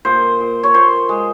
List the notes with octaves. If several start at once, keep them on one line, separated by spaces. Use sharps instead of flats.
A#2 C5
A#2
C#5
A#2 C5
G#3